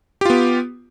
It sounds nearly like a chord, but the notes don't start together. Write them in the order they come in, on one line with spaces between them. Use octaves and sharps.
G4 F4 B3